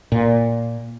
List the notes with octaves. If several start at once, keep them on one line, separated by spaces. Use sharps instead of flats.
A#2